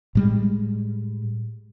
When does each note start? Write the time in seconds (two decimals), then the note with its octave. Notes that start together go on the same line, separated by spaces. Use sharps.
0.15 A2 G3 G#3